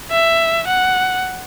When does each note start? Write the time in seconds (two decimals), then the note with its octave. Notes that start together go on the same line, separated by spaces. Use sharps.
0.11 E5
0.67 F#5